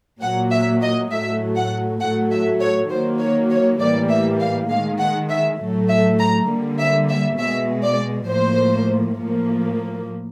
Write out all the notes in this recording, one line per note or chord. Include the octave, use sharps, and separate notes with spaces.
A#2 F#3 A#3 F#5
E5
D#5
A2 F#3 A3 E5
F#5
A2 F#3 A3 F#5
E5
C#5
D#3 F#3 A#3 C5
C#5
C#5
A2 E3 G3 A#3 D5
E5
F5
D#3 G#3 F5
F#5
E5
A2 F#3 A3
E5
A#5
D3 G3 A#3
E5
E5
B2 G#3 E5
D5
A2 F3 A#3 C5
A2 F3 A#3